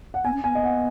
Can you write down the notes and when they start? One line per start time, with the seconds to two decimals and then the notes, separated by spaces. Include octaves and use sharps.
0.14 F#5
0.25 B3 G#5
0.34 C#4
0.43 B3 G#5
0.55 D#5
0.64 F#5